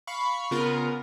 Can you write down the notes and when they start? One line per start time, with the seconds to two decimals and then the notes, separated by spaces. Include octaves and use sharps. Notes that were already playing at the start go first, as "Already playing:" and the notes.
0.07 F5 B5 C#6
0.51 C#3 B3 F4 A#4